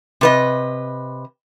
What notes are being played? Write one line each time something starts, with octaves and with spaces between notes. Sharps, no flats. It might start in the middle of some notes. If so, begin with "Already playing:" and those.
C3 B4 D#5